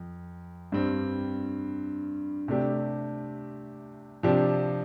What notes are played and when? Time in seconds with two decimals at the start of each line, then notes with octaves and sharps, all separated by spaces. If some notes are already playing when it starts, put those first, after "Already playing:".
Already playing: F2
0.72 G2 G3 C4
2.48 C3 A3 D4 G4
4.23 C3 F3 D4 G4